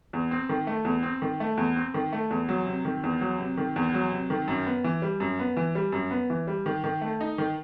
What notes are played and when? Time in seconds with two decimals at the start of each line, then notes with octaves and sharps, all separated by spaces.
0.13 E2
0.31 C4
0.49 D#3
0.67 A3
0.85 E2
1.03 C4
1.22 D#3
1.40 A3
1.57 E2
1.76 C4
1.94 D#3
2.12 A3
2.30 E2
2.49 F#3
2.67 C3
2.85 D#3
3.03 E2
3.21 F#3
3.39 C3
3.58 D#3
3.76 E2
3.94 F#3
4.11 C3
4.30 D#3
4.48 F#2
4.66 B3
4.84 E3
5.02 G3
5.20 F#2
5.39 B3
5.57 E3
5.75 G3
5.92 F#2
6.11 B3
6.30 E3
6.47 G3
6.66 D#3
6.84 D#3
7.01 A3
7.20 D#4
7.38 D#3